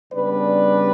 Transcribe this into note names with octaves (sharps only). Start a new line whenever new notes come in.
C#3 G3 B3 D4 B4 D5